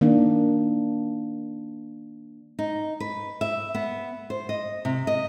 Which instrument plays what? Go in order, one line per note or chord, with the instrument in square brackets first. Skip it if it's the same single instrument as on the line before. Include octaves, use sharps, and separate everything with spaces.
[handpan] D#3 A#3 D4
[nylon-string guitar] D#4
B4
E5
B3
C5
D#5
C3
D#5